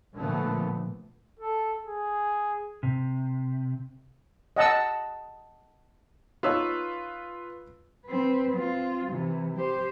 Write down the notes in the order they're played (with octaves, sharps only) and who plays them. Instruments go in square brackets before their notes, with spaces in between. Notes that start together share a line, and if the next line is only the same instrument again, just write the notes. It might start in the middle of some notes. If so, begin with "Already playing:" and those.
[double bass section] A#2 D3 F3 A3 B3
[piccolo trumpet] A4
G#4
[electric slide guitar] C3
[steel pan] D#5 F#5 A5 E6
[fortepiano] B3 D#4 C#5 [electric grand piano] F4 B4 E6
[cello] C4 B4
C4 F4
C3 E3
G4 C5